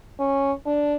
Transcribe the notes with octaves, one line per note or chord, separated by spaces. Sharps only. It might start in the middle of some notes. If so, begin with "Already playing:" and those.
C#4
D4